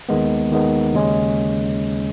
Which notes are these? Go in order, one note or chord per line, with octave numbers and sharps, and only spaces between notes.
D#2 D#3 G#3 B3
D#2 D#3 G#3 B3
D#2 C#3 G#3 C#4